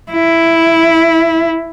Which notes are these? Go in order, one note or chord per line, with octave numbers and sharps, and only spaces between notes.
E4